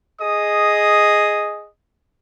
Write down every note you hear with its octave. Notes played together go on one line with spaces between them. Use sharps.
G#4 D#5 D#6